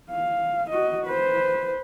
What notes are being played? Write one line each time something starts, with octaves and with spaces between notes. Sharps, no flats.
F5
F#4 D#5
B4 C5